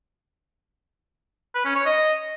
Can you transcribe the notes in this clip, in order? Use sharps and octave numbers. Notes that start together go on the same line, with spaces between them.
B4
C#4
C#5
D#5